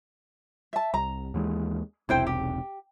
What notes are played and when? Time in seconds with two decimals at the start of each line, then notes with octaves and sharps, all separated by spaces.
0.73 E5 A5
0.94 C2 A#5
1.34 D#2 E3 G#3
2.09 E1 B1 C3 E4 C5 G5
2.27 G4